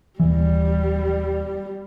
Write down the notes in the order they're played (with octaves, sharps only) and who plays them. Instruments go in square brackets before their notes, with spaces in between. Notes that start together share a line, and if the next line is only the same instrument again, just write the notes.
[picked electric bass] D#1 E3 [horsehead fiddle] G3